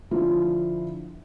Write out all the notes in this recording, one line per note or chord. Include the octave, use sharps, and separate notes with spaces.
D3 F3 E4 F4